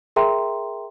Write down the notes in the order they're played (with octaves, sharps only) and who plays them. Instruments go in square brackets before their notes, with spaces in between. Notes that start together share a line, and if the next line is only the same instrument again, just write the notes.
[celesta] G#4 A#4 E5 G5 A#5 C6